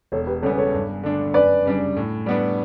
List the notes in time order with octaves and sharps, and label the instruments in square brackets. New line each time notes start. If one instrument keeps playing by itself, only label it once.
[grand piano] E1 [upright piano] A4 C#5
[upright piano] G4 B4
[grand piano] E2 C#3 G3 B3 [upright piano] A4 C#5
[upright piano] A4 C#5
[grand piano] G2
D3 A3 D4
[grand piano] F#2 [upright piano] B4 D5
[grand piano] C#3 G3 D4
A2
G3 B3 D4